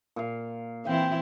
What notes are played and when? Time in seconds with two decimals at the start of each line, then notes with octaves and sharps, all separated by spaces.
0.16 A#2 F5
0.85 E3 C4 E4 F5 G5